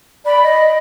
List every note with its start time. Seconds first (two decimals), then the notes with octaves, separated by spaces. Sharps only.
0.25 D5 B5
0.41 D#5